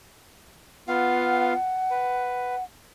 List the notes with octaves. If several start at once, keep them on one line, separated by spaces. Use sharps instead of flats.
B3 F4 F5 F#5
B4